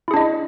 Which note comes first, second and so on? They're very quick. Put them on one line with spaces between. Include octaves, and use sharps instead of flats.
E4 G#4 D4 D#5